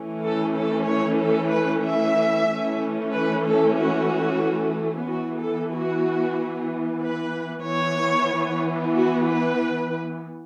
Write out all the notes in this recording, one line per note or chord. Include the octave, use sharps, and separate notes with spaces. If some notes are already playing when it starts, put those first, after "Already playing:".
Already playing: E3 A3 C#4
A4
A4
C#5
A4
B4
E5
E3 A3 C#4
B4
A4
F#4
E3 B3 F#4
A4
F#4
B4
E3 B3 C#5
F#4
B4